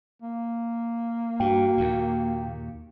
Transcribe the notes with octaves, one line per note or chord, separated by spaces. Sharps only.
A#3
G2 F#4 G5
D#2 A#2